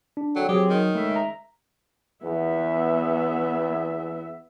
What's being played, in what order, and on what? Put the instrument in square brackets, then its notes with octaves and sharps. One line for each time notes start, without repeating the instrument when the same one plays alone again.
[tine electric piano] D4
[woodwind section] D3 C4 G#4 [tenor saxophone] F#3
[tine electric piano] F#3 [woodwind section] C4 G#4 [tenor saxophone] G4
[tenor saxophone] D#3
[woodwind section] C#3 G#3 E5 [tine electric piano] A3
[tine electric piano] A#5
[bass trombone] E2 [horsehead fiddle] B3 E5